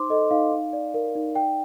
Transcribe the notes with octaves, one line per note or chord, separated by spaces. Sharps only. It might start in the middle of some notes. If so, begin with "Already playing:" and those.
Already playing: D#4 C5 C6 D6
A4 D#5
D#4 F5
D#4
D5
A#4
D#4
D5 G5